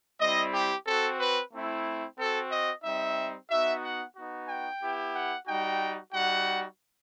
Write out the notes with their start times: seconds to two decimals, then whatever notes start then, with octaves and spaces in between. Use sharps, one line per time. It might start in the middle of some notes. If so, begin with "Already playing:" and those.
0.20 G3 C4 E4 D#5
0.54 G4
0.87 C4 F#4 A4
1.20 B4
1.53 A3 C4 E4
2.18 C4 F#4 A4
2.51 D#5
2.83 G3 C4 D#4 E5
3.50 B3 D#4 F#4 E5
3.83 F#5
4.15 B3 D#4 F#4
4.48 G5
4.82 B3 E4 G4
5.15 F#5
5.47 G3 D#4 F#4 G5
6.13 G3 D#4 F#4 F#5